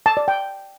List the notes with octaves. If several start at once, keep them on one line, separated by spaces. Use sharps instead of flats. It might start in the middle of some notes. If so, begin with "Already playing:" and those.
A5
D5
G5